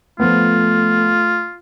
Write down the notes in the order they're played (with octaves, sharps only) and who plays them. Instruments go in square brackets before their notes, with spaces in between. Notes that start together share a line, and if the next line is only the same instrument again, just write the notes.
[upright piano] F3 B3 [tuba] A3 [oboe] F4